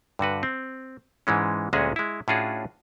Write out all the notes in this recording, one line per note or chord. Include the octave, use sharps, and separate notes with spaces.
G2 D3 F#4 B4
C4
G#2 E3 G#3 C#4
D2 A#2 G#3 C#4 F#4 G#4
G#3 E4
A2 C#4 D4 F4 F#4 G#4